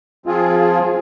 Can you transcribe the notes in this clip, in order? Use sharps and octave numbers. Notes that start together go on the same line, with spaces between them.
F3 C4 F4 G#4